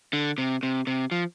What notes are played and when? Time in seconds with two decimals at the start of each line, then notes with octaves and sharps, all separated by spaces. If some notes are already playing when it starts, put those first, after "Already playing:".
0.13 D3
0.38 C3
0.63 C3
0.87 C3
1.11 F3